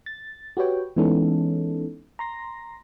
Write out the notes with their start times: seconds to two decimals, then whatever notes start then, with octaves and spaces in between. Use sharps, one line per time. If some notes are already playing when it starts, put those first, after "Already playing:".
0.06 A6
0.57 F#4 G4 B4 C#5 G5
0.96 E3 G#3 B3 C#4 D#4 A4
2.19 A#5 C6 A#6